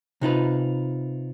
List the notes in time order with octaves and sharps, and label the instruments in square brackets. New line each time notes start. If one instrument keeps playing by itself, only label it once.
[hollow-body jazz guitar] C3 D#4 F4 B4